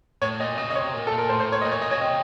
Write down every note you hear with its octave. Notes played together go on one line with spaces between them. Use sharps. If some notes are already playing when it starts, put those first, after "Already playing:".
A2 C#5
A#2 D#5
C#3 D#5
D#5
C3 C#5
A#2
A#2 A4
A#4
A2 C5
C5
C#5
A#2 D#5
C#5
D#5
C#3 C#5
C3 D#5